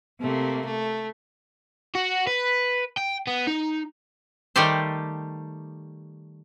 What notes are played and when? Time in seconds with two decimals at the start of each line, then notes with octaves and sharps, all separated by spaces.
0.20 C3 A3 A#3
0.65 A3
1.95 F#4
2.27 B4
2.97 G5
3.27 B3
3.47 D#4
4.56 D#3 G3 A3 G4 A4 C5